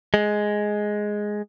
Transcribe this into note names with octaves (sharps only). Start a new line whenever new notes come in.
G#3